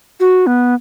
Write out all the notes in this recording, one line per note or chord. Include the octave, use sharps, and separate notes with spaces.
F#4
B3